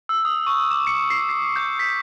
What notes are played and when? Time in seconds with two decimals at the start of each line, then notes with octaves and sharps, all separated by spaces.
0.09 E6
0.25 D#6
0.47 C#6
0.71 D6
0.87 C#7
1.10 C7
1.29 C7
1.56 G6
1.79 B6